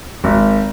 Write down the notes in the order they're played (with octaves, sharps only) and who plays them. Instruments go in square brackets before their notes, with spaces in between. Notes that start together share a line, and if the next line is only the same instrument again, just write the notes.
[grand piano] G#1